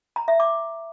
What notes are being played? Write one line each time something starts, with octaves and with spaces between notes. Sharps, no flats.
A#5
E5
D6